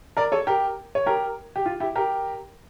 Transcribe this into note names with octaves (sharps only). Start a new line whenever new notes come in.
A#4 D5
A4 C#5
G4 A#4
C#5
G4 A#4
G4
F4
E4 G4
G4 A#4